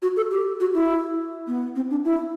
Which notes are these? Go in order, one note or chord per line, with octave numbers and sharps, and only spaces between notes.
F#4
A4
G4
F#4
E4
B3
C4
D4
E4